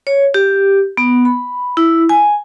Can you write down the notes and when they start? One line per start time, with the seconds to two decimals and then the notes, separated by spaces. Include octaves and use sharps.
0.07 C#5
0.34 G4
0.97 B3
1.25 B5
1.77 E4
2.09 G#5